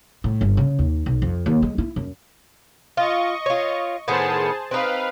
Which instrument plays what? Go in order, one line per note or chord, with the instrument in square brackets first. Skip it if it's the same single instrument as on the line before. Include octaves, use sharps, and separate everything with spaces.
[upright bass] A2
G1
C#3
D#2
B1
F2
D#2
G#3
E4
F#2
[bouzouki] F4 [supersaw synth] D#5 C#6
[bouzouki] F4 C#5
[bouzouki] A2 D#3 B3 [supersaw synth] G#4 C5 A5
[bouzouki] C4 D#4 [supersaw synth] B4 F5